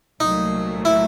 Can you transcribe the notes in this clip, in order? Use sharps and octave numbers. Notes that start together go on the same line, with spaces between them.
C2 A#2 F#3 A3 D#4
E4